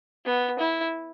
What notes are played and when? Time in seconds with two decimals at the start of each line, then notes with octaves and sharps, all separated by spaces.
0.25 B3
0.59 E4